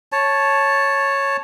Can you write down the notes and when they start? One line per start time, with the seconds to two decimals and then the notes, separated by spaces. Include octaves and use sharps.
0.12 C#5 A5